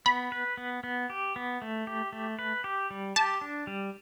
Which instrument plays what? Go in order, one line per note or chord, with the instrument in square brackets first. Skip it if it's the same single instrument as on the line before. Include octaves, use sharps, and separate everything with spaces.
[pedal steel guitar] B3 [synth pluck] B5
[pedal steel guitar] B4
B3
B3
G4
B3
A3
G4
A3
B4
G4
G3
[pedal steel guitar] G4 [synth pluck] A5
[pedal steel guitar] D4
G3